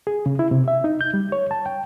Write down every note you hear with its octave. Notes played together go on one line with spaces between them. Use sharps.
G#4
C#3
E4
C3
E5
D#4
G6
G3
C#5
A5
G5